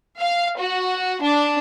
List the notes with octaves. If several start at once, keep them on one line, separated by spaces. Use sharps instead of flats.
F5
F#4
D4